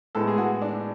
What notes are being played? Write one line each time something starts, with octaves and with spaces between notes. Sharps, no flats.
A2 G#3 B3 A4
G#4
F#4
D4